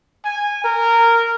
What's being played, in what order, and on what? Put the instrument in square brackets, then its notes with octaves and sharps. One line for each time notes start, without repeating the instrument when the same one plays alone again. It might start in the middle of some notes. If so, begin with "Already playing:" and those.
[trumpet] G#5
A#4